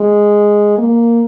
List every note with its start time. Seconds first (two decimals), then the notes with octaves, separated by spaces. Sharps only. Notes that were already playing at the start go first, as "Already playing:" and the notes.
Already playing: G#3
0.78 A#3